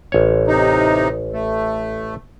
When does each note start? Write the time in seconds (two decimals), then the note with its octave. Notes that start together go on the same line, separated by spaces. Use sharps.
0.12 A1 C#5
0.47 C3 D#4
1.33 A3